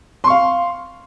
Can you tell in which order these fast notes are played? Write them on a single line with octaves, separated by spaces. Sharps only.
C6 C#6 F5